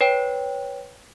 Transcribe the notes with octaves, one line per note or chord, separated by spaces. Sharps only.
B4 C#5 G5